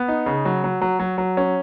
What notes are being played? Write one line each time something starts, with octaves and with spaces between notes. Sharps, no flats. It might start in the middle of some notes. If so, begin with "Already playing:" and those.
Already playing: B3
D#4
C#3
F#3
F#3
F#3
F#3
F#3
C#4